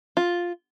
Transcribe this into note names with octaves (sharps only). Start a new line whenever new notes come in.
F4